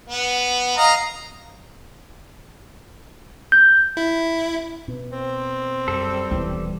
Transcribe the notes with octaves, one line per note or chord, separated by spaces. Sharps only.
B3
D#5 F5 A#5
G6
E4
B2
C4
F#2 G3 A4
D#1 B2 E3 B3